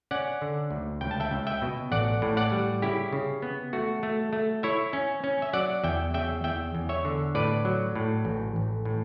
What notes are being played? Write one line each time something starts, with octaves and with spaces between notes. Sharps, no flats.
C#4 D5 F#5
D3
D2
C#2 G5
A5
E5 G5
C#2
E5 G5
B2
A1 D5 F#5
A2
D5 F#5
G3
C#3 E4 G4
C#3
B3
A3 F#4
A3
A3
E4 C#5 E5
C#4
C#4
E5
F#3 D5 F#5
E2 E5 G5
C#3 E5 G5
E2 E5 G5
E2
C#5 E5
D3
A2 B4 D5
F#3
A2
A1
A1
A2